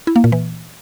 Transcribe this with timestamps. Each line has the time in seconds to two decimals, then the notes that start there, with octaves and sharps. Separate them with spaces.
0.07 E4
0.16 A#3
0.24 A#2
0.32 E3